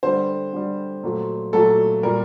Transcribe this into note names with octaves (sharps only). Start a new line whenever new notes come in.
D3 G3 C5
D3 G3
A#2 F#3 A3
A#2 F#3 A3 A4
A#2 G3 A#4